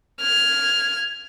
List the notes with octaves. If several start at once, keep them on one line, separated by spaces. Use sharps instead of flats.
F6 G#6